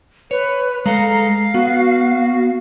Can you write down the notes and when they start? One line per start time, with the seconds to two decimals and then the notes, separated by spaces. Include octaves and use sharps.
0.31 B4 C#5
0.86 G#3 A4 F5 A#5
1.54 B3 F#4